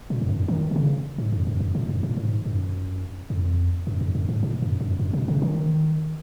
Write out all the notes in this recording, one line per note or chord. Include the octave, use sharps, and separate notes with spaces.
A#2
F2
F#2
D#3
B2
C#3
G#2
F2
F#2
F#2
A#2
F#2
A#2
G#2
F#2
F2
F#2
F2
F#2
G#2
A#2
F#2
F#2
F#2
B2
C#3
D#3